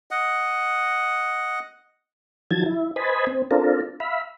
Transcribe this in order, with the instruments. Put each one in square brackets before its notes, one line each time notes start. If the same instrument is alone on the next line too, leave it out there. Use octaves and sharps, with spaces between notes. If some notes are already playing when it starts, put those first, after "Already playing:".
[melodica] D#5 F#5
[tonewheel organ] D#3 F3 F#3 A5 G#6
E4
B4 C5 D#5 G#5 A5 B5
C4
C4 D4 F4 A4 A#4
E5 F5 B5